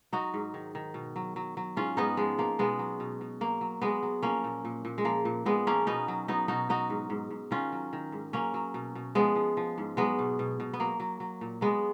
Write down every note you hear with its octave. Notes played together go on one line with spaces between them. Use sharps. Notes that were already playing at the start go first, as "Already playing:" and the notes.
F#3 D#4 F#4
G#2
D#3
D#3
B2
F#3
F#3
F#3
G#2 C#4 F4
G#2 B3 D#4
F3 G#3
F3 A#3
B2 G#3 B3
F#3
B2
B2
F#3 A#3
F#3
F#3 G#3 B3
F#3
F3 A#3 C#4
A#2
A#2
A#2
G#3
F3 A#3
A#2
A#2 G#3 B3
F3 A#3 C#4
B2 B3 D#4
F#3
F#3 B3 D#4
B2 D#4 F#4
F#3 D#4 F#4
G#2
G#2
G#2
D#3 C#4 F4
F#3
D#3
G#2
F#3 A#3 C#4
F#3
B2
B2
F3 G#3 B3
F3
F3
G#2
F#3 G#3 B3
B2
B2
B2
B3
F#3 A#3
F#3
F#3
A#2
F#3 G#3 B3